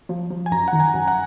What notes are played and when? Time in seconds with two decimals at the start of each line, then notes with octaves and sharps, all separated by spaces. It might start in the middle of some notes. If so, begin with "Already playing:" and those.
0.09 F3
0.31 F3
0.46 G#5
0.52 F#2 A#5
0.68 D#3 F#5
0.80 G#5
0.94 F#2
1.08 F#5